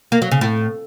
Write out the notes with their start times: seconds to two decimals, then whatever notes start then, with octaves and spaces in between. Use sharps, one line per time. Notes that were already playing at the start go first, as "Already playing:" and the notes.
0.12 A#3
0.22 F#3
0.31 C#3
0.41 A2